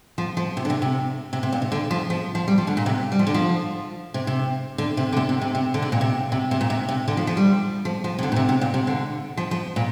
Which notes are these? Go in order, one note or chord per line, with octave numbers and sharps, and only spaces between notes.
F3
F3
C3
D3
C3
C3
C3
C3
A#2
C3
D3
F3
F3
F3
G3
F3
D3
A#2
C3
G3
F3
D3
F3
C3
C3
D3
C3
D3
C3
C3
C3
C3
D3
C3
A#2
C3
C3
C3
A#2
C3
C3
D3
F3
F3
G3
F3
F3
C3
D3
A#2
C3
C3
A#2
C3
D3
F3
F3
A#2